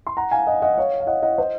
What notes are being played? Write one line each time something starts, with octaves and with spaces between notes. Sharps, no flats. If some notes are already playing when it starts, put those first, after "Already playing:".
C6
F#5 A#5
F5 G#5
D#5 F#5
D#5 F#5
C#5 F5
F5
D#5 F#5
D#5 F#5
C5 D#5